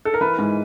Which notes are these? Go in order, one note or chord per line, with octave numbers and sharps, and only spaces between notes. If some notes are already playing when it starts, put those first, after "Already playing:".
A4
A#4
E3 B4
G#2